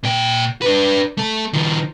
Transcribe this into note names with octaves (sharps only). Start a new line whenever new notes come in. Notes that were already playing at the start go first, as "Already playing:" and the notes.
A#2 G5
D4 B4
A3 A4
D#3 F3